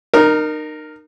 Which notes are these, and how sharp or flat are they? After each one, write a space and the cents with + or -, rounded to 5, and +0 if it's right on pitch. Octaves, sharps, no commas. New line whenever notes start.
D#4 -30 A#4 +0